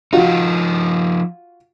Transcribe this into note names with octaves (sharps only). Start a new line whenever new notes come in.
F3 D#4 F4 F#4